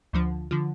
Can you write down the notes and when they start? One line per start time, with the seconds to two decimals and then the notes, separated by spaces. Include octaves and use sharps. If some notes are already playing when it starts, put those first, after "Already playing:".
0.13 D2 D3 F3
0.51 D3 F3